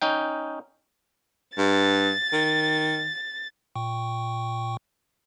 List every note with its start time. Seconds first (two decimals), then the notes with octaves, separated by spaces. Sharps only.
0.02 C#4 D#4 G5
1.58 G2 A6
2.33 D#3
3.75 A#2 G5 C#6